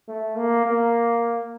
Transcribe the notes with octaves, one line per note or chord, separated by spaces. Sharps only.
A3
A#3
A#3